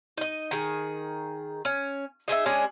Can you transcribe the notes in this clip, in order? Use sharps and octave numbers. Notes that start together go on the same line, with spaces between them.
D#4 D#5
D#3 G#4
C#4
D#4 G#4 C5 E5
G#3 C#4 D4 G#4